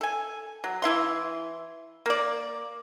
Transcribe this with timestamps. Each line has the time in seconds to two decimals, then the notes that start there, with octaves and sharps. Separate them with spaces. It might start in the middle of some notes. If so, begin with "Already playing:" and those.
0.01 A4 G#5
0.64 F#3
0.82 E3 E4 F5 C6
2.06 A#3 D5